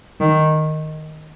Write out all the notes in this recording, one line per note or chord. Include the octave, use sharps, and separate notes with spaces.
D#3